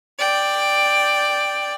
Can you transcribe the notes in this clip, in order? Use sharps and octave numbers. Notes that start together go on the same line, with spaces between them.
D5 G5